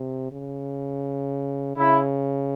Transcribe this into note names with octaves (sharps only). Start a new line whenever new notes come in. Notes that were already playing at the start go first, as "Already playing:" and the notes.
Already playing: C3
C#3
C#3 E4